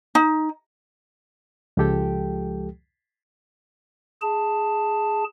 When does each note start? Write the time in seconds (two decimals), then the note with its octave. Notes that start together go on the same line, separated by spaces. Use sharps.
0.15 D#4
1.77 C#2 F3 G#3 G4 A4 G5
4.22 G#4 A5